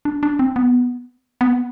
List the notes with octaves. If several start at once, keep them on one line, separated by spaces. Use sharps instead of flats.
D4
D4
C4
B3
B3